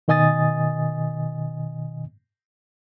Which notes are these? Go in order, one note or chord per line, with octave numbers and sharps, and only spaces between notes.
B2 D#3 D#5 G#5 D#6 A6